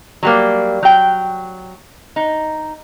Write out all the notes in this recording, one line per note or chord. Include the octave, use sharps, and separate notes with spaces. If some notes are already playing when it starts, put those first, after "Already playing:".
F#3 G3 A#3
F#3 G5
D#4